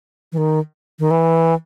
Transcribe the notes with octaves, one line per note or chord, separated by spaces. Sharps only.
E3
D#3
D#3
E3